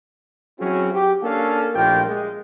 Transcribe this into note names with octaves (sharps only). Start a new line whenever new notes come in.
F#3 C4 C#4 E4 F#4 G#4
G4
A#3 C#4 D4 A4 F5
A#1 A2 F4 G4 A#4 G5
G#3